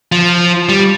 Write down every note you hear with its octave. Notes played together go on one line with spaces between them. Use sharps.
F3
G3